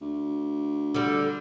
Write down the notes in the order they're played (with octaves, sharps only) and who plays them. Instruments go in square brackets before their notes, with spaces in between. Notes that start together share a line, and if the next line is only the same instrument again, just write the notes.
[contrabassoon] D2
[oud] D3 G3